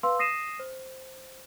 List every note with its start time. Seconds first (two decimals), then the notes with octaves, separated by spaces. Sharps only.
0.03 B4 F5 C6 E6
0.19 D#6 A#6 C7 D#7 E7
0.59 C5